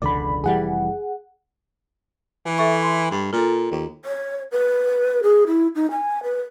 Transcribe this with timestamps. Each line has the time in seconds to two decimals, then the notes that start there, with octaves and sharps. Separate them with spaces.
0.02 E1 C#2 D3 D5 B5
0.44 F1 E3 G3 G#4 F#5
2.45 E3
2.58 A4 E5 C#6
2.83 C6
3.11 G2
3.33 A#2 F4 A4
3.71 D#2
4.05 C#5
4.52 B4
5.23 G#4
5.47 E4
5.75 D#4
5.91 G#5
6.23 B4